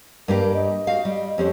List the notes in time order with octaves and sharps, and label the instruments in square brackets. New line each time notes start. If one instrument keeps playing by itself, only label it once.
[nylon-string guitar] G2 A#3 G4 [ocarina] A#4
[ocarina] D#5
[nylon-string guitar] F#4 G4 F5
G3
[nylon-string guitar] F2 C#4 C5 [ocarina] G4